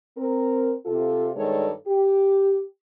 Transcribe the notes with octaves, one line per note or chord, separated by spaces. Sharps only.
C4 A#4
C3 F4 A4
G2 D#3 G#3 A4 C#5 D5
G4